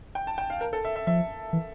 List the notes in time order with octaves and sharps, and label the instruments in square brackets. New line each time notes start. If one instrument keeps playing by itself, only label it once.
[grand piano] G5
A5
G5
F5
A#4
A4
E5
E5
[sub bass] F3 [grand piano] E5
[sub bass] E3